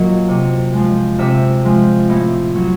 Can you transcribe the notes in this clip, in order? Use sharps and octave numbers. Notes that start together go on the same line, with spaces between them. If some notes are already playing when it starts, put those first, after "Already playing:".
Already playing: A#2 F#3 D#5
C3
F3 G#3
C3 E5
F3 G#3
A2
F#3